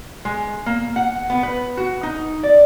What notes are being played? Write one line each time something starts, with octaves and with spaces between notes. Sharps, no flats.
G#3
A#3
F#5
B3
B4
F#4
D#4
D5